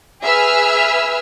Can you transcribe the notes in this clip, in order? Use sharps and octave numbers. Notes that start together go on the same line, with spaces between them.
G#4 B4 E5 E6 F6